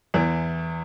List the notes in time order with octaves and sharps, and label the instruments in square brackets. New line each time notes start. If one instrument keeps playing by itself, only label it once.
[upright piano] E2 E3